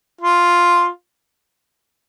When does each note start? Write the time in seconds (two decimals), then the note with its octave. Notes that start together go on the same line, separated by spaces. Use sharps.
0.21 F4